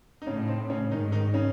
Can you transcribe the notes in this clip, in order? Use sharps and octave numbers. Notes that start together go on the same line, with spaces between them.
D#4
A2 C#3 C#4
C4
C#3 C#4
G#2 D#3 D#4
D#3 D#4
C#3 C#4